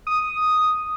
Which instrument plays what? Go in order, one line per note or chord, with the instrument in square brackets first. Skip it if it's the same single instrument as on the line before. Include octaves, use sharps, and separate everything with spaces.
[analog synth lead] D#6